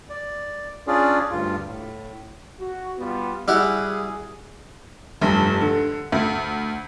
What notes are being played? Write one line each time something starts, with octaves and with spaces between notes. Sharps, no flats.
D5
C#4 D4 F4 G#4 D5
D2 G2 F4
A2
F#4
G3 B3 F4
G3 E4 F#4 G#4
F1 G2
D3
D2